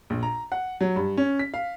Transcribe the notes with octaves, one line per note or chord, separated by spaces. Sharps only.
A#1
A#5
F#5
F#3
G2
C#4
B6
F5